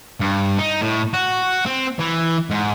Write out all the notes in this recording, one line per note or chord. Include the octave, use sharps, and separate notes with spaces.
G2
D#4
A2
F#4
C4
E3
G#2